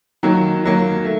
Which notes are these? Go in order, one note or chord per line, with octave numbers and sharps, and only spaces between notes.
D#3 F#3 A#3
D#3 F#3 A#3
A3